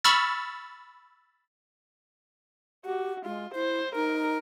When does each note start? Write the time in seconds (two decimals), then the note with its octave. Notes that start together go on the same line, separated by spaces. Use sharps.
0.04 B5 C#6 E6 F6 A6
2.85 F#4 G4
3.25 G#3 F4
3.54 E4 C5
3.95 D#4 A#4